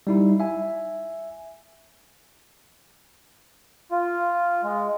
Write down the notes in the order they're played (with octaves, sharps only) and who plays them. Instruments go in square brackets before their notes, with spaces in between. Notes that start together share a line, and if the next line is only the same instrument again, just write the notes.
[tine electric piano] G3 D#4 E4
E5 G#5
[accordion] F4
G#3